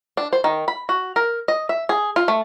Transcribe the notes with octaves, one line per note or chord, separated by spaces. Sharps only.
D4
C5
D#3
B5
F#4
A#4
D#5
E5
G#4
F4
A3